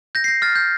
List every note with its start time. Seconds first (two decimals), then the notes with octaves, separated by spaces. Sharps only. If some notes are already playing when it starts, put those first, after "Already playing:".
0.15 G6 A#6
0.24 C7
0.28 G6 A#6
0.42 F6 A6
0.55 G6